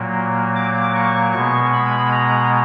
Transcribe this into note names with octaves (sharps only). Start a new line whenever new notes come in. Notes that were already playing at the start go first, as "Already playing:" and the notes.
Already playing: A#2 F#3 A#3
D6
C#6
B2 G#3 B3
B5
A#5